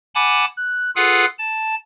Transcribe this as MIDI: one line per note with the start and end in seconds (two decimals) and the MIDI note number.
0.15 0.45 78
0.15 0.45 80
0.15 0.45 81
0.15 0.45 83
0.15 0.45 86
0.57 0.91 90
0.96 1.26 65
0.96 1.26 68
0.96 1.26 69
0.96 1.26 71
0.96 1.26 77
0.96 1.26 78
1.39 1.75 81